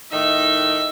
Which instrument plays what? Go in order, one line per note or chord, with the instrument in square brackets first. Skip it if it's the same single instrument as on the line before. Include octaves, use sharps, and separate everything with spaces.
[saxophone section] A2 D#3 D#4 [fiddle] E5